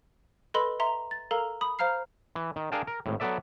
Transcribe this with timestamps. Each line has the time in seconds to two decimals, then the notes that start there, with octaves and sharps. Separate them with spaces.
0.54 A4 B4 D#5 B5 C6 G7
0.80 E5 A#5 C6
1.11 A6
1.31 A4 A#4 F5 A#5
1.61 B5 D#6
1.79 C5 F5 A#5 F6 C7
2.35 E3
2.56 D#3
2.72 D4 G#4 A#4 F5 G5 A5
2.87 A#4
3.06 G#1 A2
3.20 F#3 B3 A4 D5 E5